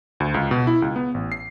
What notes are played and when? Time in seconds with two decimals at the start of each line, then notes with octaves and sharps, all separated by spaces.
0.20 D2
0.34 C#2
0.51 B2
0.67 E4
0.82 C#2
0.96 B3
1.14 A1
1.32 C7